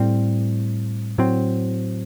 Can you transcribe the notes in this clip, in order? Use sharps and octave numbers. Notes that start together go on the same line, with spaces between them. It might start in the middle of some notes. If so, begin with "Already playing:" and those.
Already playing: A2 G3 C4
A2 F#3 C4